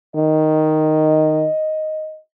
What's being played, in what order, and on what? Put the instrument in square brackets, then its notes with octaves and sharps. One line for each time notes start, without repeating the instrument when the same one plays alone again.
[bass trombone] D#3 [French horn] D#5